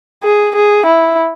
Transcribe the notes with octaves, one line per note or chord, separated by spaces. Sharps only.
G#4
G#4
E4